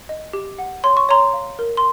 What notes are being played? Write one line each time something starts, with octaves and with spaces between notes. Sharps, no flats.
D#5
G4
F#5
C#5 C6
C#6
C#5 A#5 C6
F5
A#4
C6